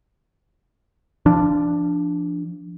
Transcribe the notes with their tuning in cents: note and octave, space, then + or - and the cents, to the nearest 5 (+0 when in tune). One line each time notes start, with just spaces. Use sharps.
F3 -25 D4 +0